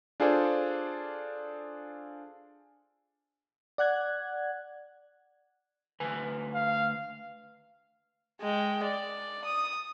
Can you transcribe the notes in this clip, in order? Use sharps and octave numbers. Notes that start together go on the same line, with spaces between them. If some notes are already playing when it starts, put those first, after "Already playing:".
D4 F4 G#4 A4 C5 D5
D5 F#5 F#6 G#6
D2 B4 G#5
F5
G#3 G5
D5
D#6